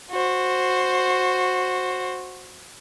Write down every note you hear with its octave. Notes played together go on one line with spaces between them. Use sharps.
F#4 C5